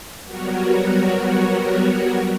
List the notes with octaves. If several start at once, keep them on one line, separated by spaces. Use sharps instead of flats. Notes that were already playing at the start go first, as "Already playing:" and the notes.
F#3 G3 B3 F#4 A#4 C#5